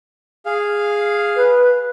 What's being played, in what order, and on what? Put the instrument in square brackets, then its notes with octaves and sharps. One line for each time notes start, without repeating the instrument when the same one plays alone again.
[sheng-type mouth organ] G#4 F5
[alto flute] B4